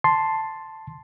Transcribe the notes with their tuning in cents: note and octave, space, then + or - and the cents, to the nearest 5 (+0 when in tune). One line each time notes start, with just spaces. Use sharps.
A5 +0 C6 +0